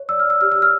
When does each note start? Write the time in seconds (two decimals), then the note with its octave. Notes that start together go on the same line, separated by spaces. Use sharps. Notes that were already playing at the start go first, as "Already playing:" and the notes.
Already playing: C#5
0.09 D5 E6
0.19 F6
0.26 D5 E6
0.41 G4 F6
0.52 E6
0.57 G4
0.62 F6